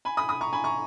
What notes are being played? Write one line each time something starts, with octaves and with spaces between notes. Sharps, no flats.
G#5 B5
B5 D#6
B5 D#6
A#5 C#6
G#5 B5
A#5 C#6